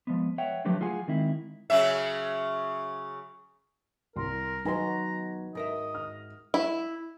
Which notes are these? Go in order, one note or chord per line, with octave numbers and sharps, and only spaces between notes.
F3 G#3 B3
B4 C#5 E5 F#5 G5
D3 F3 F#3 A3 G4 B4
F4 G#4 F#5 G#5
D#3 G#3 C4 D#4 E4
C#3 F#3 E5
C2 A#4 C6
B1 F#3 D#4 F#4 B4 G#5 A#5 C6
G#2 A#4 D#5 E5
F6
E4